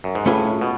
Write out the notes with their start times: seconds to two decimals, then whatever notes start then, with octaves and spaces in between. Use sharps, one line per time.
0.04 F#2
0.15 G#2
0.26 A2 A3 C#4 F4 G#4 B4
0.61 B2